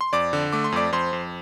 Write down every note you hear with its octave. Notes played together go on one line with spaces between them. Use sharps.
C6
F2 D5 D6
D3
A3 D6
C6
F2 D5 D6
F2 C5 C6
F2